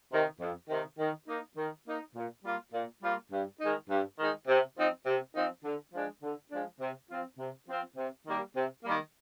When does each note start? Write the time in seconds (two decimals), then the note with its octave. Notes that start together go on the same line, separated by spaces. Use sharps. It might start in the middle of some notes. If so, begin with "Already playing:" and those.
0.12 C3 D#3
0.40 F2
0.70 C3 D#3
0.99 D#3
1.27 A#3 D#4
1.56 D#3
1.86 A#3 D#4
2.15 A#2
2.44 G3 A#3 F4
2.73 A#2
3.03 G3 A#3 F4
3.32 G2
3.61 D#3 G#3 D#4
3.90 G2
4.18 D#3 G#3 D#4
4.48 C3
4.76 F3 C4 D#4
5.06 C3
5.35 F3 C4 D#4
5.63 D3
5.93 F3 G#3 D4
6.22 D3
6.51 F3 G#3 D4
6.80 C3
7.09 F3 C4 F4
7.38 C3
7.68 F3 C4 F4
7.97 C3
8.25 D#3 G3 A#3
8.55 C3
8.83 D#3 G3 A#3